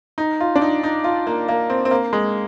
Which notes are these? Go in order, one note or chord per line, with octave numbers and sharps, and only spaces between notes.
D#4
F4
D4
D#4
D#4
F4
A#3
A#3
C4
C4
A#3
G#3